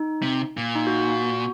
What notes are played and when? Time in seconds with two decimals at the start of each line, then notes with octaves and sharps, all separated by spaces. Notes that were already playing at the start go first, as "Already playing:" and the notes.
Already playing: D#4
0.22 C3
0.57 A#2
0.75 D#4
0.87 F#4
0.98 F#4